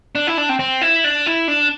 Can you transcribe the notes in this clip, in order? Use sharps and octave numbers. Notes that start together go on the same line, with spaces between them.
D4
E4
D4
C4
C4
E4
D4
E4
D4